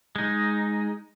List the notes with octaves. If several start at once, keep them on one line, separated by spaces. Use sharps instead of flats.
G#3 D#4